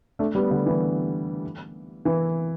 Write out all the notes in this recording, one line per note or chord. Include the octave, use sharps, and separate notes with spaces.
A3 D4
G3 B3
D3 G3
E3
E3